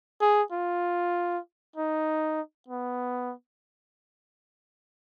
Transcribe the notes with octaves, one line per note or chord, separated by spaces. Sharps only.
G#4
F4
D#4
B3